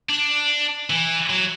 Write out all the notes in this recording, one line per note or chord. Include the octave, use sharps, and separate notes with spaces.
D4
E3
F#3